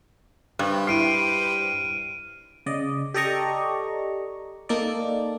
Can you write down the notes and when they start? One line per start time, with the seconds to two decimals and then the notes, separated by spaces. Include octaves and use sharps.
0.59 G2 G4 B4 C5
0.87 E4 F6 C7 D7 D#7
2.66 C#3 D5 D#5
3.14 G4 A4 D5 D#5 A#5 C#6
4.69 A#3 D#4 A4 D5